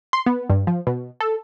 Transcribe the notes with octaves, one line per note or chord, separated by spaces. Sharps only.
C6
B3
G2
F3
B2
A4